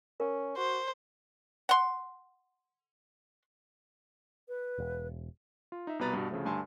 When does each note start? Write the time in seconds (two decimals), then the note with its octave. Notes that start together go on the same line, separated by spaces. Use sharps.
0.20 C#4 A#4
0.57 F#4 C5
1.69 F#5 C6
4.48 B4
4.78 E1
5.72 F4
5.87 D#4 E5
5.99 C2 B2 B3 B4 A#5 A6
6.13 G2 B2
6.30 D2 C#3 F3 A3
6.45 D2 G2 G#5 A5 C6